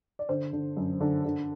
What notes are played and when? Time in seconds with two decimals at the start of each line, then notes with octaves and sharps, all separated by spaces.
0.19 D5
0.29 D3 C5
0.53 D3
0.77 F#2
1.01 D3
1.25 D3